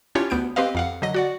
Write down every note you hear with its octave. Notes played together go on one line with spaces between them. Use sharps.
C#4 D4 E4 F4 G4 C#5
D2 B3 G6 D7
C4 G4 B4 D#5 F5
F2 F5 F#5
D3 F#3 D#5 A#6
F#4 D5 F#5